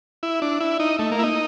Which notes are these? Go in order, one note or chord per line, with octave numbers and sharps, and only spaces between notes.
E4
D4
E4
D#4
A3
A#3
E4
D#4